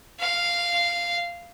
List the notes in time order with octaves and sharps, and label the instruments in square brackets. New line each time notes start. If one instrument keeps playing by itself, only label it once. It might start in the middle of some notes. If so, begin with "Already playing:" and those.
[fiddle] F5